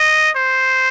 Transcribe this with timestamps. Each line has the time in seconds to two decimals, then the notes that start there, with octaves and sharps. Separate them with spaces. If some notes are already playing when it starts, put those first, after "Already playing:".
Already playing: D#5
0.36 C5